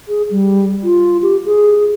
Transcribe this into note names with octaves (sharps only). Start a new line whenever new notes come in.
G#4
G3
F4
G4
G#4